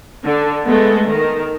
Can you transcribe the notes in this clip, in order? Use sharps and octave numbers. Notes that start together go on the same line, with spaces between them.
D3
G#3 A3 B3 A4
D#3